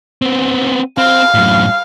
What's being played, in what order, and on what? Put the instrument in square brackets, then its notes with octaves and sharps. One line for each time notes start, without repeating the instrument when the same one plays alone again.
[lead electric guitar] B3 C4
[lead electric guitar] C4 [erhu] F5
[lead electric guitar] F#2 A2